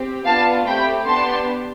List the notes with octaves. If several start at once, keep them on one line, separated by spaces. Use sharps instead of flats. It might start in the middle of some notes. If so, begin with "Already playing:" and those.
Already playing: C4 G4
B3 D4 F4 F5 A5
A3 C4 G4 G5 B5
B3 D4 G4 A5 C6